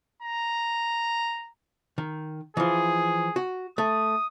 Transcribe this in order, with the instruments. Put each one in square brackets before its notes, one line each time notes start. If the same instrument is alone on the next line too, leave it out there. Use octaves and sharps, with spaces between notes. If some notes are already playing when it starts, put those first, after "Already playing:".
[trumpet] A#5
[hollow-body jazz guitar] D#3
[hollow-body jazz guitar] E3 F3 [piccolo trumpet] G#4
[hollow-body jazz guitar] F#4
[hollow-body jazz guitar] A3 [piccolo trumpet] D#6